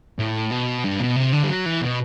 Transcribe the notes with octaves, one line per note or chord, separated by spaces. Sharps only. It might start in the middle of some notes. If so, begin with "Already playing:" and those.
A2
B2
G2
B2
C3
D3
G3
F#3
E3
B2